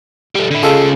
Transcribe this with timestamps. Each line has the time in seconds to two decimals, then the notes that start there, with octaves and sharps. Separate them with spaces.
0.35 G3 A3
0.51 D3 E4
0.63 C#3 F4 G#4 A4 D#5